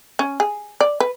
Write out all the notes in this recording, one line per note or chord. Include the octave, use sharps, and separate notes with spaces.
C#4
G#4
D5
B4